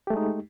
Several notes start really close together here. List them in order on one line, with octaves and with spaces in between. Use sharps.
G4 A3 G#3 D#4